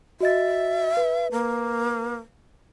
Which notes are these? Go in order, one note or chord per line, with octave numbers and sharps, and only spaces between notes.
F#4 D#5 E5 A6
B4
A#3